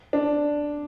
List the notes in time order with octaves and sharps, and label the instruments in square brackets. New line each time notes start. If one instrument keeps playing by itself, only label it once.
[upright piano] D4